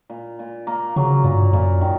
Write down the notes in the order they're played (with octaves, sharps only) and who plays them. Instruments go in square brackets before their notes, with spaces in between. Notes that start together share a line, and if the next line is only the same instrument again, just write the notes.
[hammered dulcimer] A#2
A#2
A#3
[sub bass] C#3 [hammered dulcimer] F#3
[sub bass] G2 [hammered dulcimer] A#2
[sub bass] F#2 [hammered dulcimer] A#2
[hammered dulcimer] D#3